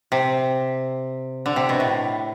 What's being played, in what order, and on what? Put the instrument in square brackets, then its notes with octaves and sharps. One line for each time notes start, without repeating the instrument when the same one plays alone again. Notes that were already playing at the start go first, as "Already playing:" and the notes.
[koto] C3
D3
C3
B2
A2